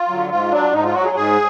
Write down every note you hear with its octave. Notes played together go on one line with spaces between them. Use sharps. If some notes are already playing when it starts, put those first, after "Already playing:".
Already playing: F4
D3 F#3
G#2 F4
F#3 D4
G#2 D#4
F4
F#3 F#4
G#4
G#2 G#4